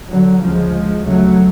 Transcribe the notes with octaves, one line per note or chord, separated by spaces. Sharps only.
D3 F#3
D2 C#3 F3 G#3
D2 C#3 F#3 A3